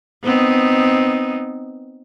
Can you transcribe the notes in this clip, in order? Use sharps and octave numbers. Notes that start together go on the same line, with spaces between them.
B3 C4 D#4